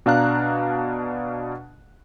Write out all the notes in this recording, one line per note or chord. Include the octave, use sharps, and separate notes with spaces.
B2 D4 F5 A#5 F#6